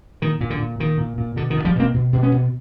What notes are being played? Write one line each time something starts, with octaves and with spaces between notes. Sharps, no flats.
A#2 D#3
A#2
D3
A#2
A#2 D#3
A#2
A#2
B2 D3
D#3
B2
F3 G3
B2 A#3 C4
B2
B2
B3 C#4
B2